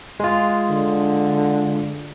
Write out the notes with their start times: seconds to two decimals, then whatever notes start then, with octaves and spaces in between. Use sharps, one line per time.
0.20 G#3 F4
0.70 D3